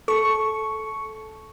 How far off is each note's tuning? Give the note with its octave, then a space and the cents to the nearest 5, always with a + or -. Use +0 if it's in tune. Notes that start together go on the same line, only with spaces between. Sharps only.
A4 -15 C#6 +0